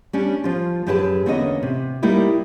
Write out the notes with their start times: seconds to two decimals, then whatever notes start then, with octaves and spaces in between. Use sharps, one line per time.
0.13 G3 C#4 D4
0.44 F3 F4
0.87 F#2 G4 G#4 B4 G#5 A5
1.26 E2 D3 A#3 C#4 A4 D#5
1.63 C3
2.02 G3 A#3 D#4 E4 G4